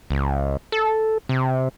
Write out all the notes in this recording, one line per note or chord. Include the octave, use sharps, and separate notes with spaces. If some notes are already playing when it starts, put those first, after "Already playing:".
C#2
A4
C3